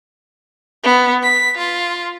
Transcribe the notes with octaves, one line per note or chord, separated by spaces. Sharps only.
B3
B6
F4